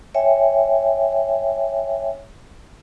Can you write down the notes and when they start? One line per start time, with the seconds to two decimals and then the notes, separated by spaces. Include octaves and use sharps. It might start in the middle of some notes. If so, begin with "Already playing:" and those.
0.15 C#5 E5 G5 G#5